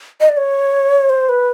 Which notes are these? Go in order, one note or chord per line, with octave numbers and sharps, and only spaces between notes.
D#5
D5
C#5
C5
B4